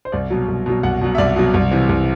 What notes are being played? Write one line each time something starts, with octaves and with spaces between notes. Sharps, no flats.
C5
C2 D5
B2 F#3
C2
B2 F#3
C2 F#5
B2 F#3
E5
C2 D5
B2 F#3
C2
C3 E3
C2